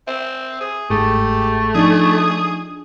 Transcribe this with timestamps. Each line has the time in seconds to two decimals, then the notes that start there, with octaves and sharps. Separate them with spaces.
0.07 C4 E5
0.61 G#4
0.90 G1 G#2 A3 G4 G#4
1.75 F3 D4 D#4 G#4